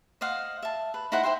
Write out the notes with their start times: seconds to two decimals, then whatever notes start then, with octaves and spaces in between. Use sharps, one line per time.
0.21 C5 D#5 F5 F#5
0.62 E5 A5
0.94 B4
1.12 D#4 E4 C5 F#5
1.23 C5 E5 G5 C6